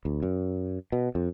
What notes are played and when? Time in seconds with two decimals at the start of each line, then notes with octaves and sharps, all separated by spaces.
0.05 D2
0.23 F#2
0.92 B2
1.15 F2